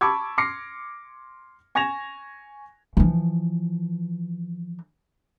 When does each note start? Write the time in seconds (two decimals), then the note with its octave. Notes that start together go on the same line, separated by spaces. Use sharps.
0.01 A5 B5 C#6 D6 E6 G#6
0.38 C6 D6 F6 A#6 C7 C#7
1.75 G#5 C#6 G#6 A#6 E7 F7
2.97 E3 F3